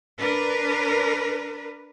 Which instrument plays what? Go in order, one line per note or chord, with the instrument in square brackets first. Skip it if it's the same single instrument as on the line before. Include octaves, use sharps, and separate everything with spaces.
[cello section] D4 A#4 B4